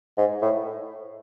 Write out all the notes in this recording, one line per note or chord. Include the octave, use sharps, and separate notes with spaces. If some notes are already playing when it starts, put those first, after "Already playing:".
G#2
A2